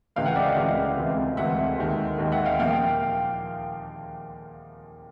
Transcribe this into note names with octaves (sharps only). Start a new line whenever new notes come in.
C#2 C#3 E3 A3 F5 G5
F#5 G#5
D5 E5
D#5 F5
C#2 C#3 E3 A3
D2 C3 E3 G#3
D2 C3 E3 G#3 E5 F#5
D#2 D#3 G#3
D#2 D#3 G#3
E5 F#5
F5 G5
A#2 F3 A#3 F5 G5